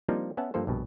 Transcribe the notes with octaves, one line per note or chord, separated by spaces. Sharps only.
F3 G3 A#3 C4 D4 D#4
B3 C#4 E5 F#5 A5
G2 F3 A#3 A4 C5
A#1 G2 B2